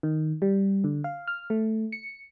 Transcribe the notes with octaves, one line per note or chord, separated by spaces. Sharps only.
D#3
G3
D3
F5
F6
A3
C#7